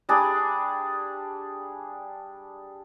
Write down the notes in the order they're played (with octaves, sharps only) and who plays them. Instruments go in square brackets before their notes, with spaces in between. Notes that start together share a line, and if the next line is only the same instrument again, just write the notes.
[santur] G3 D4 G#4